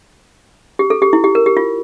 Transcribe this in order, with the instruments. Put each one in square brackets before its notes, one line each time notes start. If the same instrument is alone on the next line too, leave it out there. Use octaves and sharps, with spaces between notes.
[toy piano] G4
A4
G4
E4
G4
A#4
G4
F4